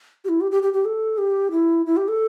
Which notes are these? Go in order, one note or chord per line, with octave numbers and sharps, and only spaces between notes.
G4
E4
G4
G4
G4
G4
A4
G4
E4
E4
G4
A4